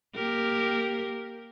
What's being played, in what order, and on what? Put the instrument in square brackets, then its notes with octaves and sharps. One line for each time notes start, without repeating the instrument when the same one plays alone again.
[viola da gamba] A#3 G4 A#4